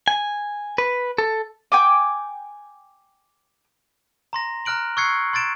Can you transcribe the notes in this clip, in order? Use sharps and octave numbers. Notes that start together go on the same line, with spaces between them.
G#5
B4
A4
G5 G#5 D6
A#5 C6 A#6
A#5 F6 F#6 D7 F#7
C#6 E6 F#6 G#6 C7 C#7
C6 G#6 A6 D7 E7